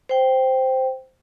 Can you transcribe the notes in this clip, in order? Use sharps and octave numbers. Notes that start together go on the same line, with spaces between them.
C5 G5